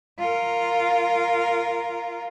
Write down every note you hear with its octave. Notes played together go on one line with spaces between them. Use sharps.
F4 A#4